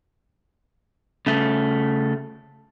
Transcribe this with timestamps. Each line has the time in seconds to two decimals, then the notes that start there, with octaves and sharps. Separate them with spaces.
1.27 C#3 A3